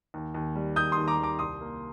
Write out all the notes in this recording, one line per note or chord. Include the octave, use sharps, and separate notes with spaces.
D#2
D#2
G3
D#3 D#6 G6
C6 D#6
D#2
A#5 D6
D#2
A#5 D6
C2 C6 D#6
A#3